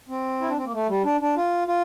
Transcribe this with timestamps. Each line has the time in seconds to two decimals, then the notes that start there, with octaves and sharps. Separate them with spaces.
0.09 C4
0.41 E4
0.49 D4
0.57 C4
0.64 A#3
0.73 A3
0.88 G3
1.04 D4
1.21 D4
1.37 F4
1.68 F4